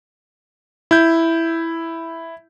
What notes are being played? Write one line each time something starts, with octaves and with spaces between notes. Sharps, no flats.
E4 G6